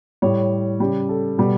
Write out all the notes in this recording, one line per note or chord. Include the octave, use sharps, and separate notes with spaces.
A2 G3 C#5
C#3 G3 G4
A4
B2 G3